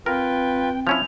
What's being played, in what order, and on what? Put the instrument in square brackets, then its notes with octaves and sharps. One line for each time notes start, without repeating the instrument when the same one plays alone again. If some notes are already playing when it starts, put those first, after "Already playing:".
[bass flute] C4 [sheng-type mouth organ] F4 B4 [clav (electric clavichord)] A#4 [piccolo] G5
[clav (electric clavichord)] F3 C#4 E4 [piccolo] F7